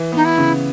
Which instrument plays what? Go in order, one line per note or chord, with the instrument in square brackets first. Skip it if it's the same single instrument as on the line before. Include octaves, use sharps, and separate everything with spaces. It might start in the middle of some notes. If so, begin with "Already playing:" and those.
Already playing: [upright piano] E3
[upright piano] B3 [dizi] D#4
[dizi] E4
[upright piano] C#3